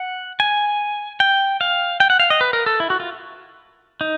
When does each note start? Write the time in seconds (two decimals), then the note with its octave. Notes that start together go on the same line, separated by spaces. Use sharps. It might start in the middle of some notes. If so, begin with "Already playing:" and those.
Already playing: F#5
0.40 G#5
1.20 G5
1.61 F5
2.00 G5
2.10 F#5
2.20 F5
2.30 D#5
2.41 B4
2.53 A#4
2.66 A4
2.80 E4
2.90 F#4
3.00 F4
4.01 D#4